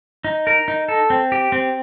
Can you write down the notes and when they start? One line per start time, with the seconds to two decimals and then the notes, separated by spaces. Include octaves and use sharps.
0.25 D#4
0.47 A#4
0.68 D#4
0.89 A4
1.10 C4
1.32 G4
1.52 C4